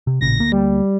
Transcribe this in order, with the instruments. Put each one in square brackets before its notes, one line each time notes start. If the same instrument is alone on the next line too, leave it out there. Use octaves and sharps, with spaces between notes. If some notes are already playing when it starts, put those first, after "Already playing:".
[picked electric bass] C3
[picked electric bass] A1 A#2 C#3 [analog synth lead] A#6
[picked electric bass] D2 A#3
[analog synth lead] G3